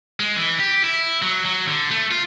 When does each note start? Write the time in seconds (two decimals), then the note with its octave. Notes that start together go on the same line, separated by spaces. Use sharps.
0.20 G#3
0.36 E3
0.59 G4
0.84 E4
1.22 F#3
1.45 F#3
1.68 D3
1.91 A3
2.11 F4